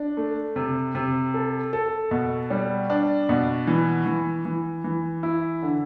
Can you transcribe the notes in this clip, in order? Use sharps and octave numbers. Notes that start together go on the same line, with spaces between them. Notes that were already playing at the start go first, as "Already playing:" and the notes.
Already playing: D4
A3
C3
C3
A4
A4
B2
G3
D4
B2
E3
E3
E3
E3
E4
D3